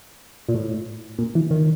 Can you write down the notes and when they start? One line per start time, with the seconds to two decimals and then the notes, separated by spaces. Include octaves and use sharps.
0.49 A#2
0.54 A2
1.19 A#2
1.35 E3
1.51 D#3